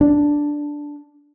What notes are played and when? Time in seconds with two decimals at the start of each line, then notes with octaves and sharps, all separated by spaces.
0.01 D4